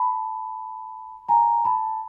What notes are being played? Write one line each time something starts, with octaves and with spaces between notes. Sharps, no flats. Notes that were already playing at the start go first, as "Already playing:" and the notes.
Already playing: A5 B5
G#5 A#5
A5 B5